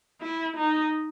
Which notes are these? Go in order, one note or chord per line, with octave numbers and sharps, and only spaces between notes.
E4
D#4